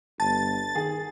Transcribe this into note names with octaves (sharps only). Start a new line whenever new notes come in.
G1 A5 A6
D#3 G#4